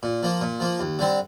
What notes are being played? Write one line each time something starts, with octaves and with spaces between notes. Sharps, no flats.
A#2
F3 A#3
A#2
F3 A#3
D#2
D3 G3 C4